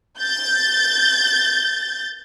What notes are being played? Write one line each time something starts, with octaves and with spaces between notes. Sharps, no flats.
G6 A6